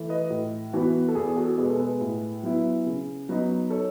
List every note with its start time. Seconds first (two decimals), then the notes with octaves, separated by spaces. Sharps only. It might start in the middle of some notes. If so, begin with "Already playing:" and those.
Already playing: E3 A3
0.09 B4 D#5
0.30 A2
0.73 E3 B3 F#4
1.09 A4
1.15 E2 G#4
1.36 F#4 A4
1.58 B2 G#3 G#4 B4
1.70 A4
1.79 G#4 B4
2.01 A2
2.43 F#3 B3 E4
2.86 C#3
3.29 F#3 B3 D#4
3.70 A4 C#5